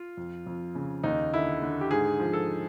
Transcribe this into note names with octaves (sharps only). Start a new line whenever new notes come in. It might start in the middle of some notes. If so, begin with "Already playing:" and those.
Already playing: F4
F2
F2
C#3
D#2 D#4
D3 E4
D3
G4
G#2 G#4
F3
A4